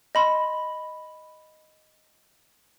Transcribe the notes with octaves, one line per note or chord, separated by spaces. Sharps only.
D#5 B5 C6